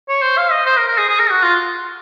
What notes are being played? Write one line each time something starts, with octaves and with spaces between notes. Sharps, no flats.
C#5
C5
F5
D#5
C5
A#4
A#4
G#4
G#4
A#4
F#4
F4